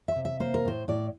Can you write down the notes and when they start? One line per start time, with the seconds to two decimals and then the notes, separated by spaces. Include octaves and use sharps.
0.08 E5
0.16 C3
0.25 E5
0.40 A#3 C5
0.54 A#4
0.65 A2 C5
0.88 A2 D5